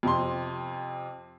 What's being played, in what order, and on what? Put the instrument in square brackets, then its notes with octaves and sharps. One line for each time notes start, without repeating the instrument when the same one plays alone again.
[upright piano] F2 C3 C6